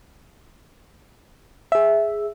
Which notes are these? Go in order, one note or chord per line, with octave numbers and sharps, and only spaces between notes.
G#4 E5